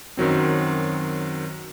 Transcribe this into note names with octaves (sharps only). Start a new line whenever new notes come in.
F#2 D#3 F#3 C4